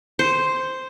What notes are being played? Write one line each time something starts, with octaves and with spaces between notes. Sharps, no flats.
C5